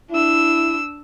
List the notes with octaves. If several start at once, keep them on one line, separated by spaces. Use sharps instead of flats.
D4 E4 E6